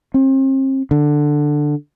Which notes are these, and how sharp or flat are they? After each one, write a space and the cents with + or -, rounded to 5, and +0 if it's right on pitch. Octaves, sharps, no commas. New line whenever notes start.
C4 +40
D3 +10